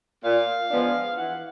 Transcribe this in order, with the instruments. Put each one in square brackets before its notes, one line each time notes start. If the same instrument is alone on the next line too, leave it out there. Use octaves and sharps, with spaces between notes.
[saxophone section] A#2 F5
F3 G#3 B3 D4
E3 F#5